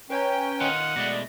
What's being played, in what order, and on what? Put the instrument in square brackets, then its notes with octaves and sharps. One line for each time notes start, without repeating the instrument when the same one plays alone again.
[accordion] C#4 G5 [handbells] B4 C#5 A#5
[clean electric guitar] D#3 D#4 F4 [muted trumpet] F#5
[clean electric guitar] B2 G#3 A3 [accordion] D5 [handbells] A#6